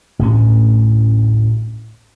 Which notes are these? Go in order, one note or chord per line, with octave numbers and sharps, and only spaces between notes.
A1 D2 A2 C#4